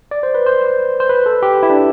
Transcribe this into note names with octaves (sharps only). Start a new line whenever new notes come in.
D5
C5
B4
C5
C5
B4
A4
G4
E4
D4